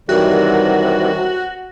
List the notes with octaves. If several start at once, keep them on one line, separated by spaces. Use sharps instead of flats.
C2 F#2 C3 D#3 E3 G3 F#4